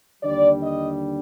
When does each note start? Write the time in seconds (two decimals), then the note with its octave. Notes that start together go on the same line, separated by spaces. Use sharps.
0.23 D#2 D3 G3 D5
0.62 D#5